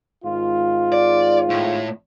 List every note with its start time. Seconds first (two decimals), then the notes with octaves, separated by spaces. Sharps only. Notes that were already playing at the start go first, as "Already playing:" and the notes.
0.24 G#1 G#2 F4
0.92 D5
1.50 A2